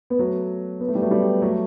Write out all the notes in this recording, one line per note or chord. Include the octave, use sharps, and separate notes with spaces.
B3
F#3 A3
B3
A3
G3
F#3 A3
G3 B3
F#3 A3